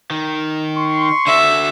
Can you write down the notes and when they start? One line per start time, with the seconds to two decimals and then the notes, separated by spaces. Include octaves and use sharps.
0.10 D#3
0.75 C6 C#6
1.27 D3 F#4 E5